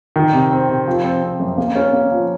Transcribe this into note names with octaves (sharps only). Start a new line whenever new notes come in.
D#3
C3
C4
C3
F3
C4
C4
F#2
A#3
C#4
A#3
F3